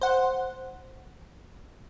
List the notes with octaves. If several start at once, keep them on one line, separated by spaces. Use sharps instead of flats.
C5 F#5